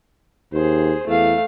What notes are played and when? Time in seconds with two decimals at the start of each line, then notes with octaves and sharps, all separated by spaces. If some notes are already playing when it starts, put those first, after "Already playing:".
0.53 D#2 G#4 C5
1.07 E2 A3 F5